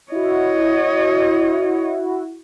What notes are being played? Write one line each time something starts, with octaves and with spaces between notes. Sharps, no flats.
E4 F#4 C#5 D#5